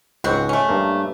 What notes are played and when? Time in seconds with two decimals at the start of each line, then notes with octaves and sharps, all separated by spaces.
0.24 C#2 G#2 C4 F#4
0.49 A3 C#4
0.69 G2 A#3